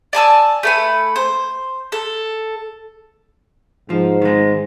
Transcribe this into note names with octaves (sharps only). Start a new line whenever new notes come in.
D5 G#5 A5 E6
A3 B4 G#5
C5
A4
G#2 F3
D#3 G#3